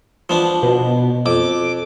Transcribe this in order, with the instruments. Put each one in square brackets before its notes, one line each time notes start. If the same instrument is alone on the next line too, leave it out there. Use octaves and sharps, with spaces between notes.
[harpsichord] F3 B3 D4
[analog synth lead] B2
[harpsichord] F2 [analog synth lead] D6